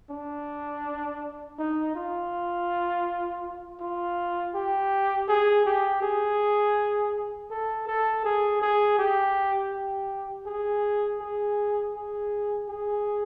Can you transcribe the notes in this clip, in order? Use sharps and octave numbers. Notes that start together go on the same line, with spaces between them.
D4
D#4
F4
F4
G4
G#4
G4
G#4
A4
A4
G#4
G#4
G4
G4
G#4
G#4
G#4
G#4